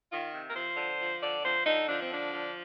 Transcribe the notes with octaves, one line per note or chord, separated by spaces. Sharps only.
D#3 F4
C3
A#4
F3 C5
D3
F3
D3 D5
F3 C5
D3 D#4
F3 D4
C4
D3 D4
F3